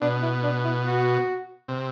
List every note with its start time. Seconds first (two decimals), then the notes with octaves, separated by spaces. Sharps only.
0.02 B2 D4
0.22 E4
0.44 D4
0.64 E4
0.86 F#4
1.68 C3